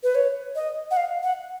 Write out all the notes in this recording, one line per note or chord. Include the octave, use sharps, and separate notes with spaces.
B4
C#5
D#5
F#5
F5
F#5